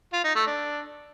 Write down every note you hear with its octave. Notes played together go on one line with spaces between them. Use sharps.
F4
D#4
A3
D4